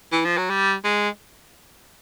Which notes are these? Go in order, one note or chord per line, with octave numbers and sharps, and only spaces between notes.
E3
F3
F#3
G3
G#3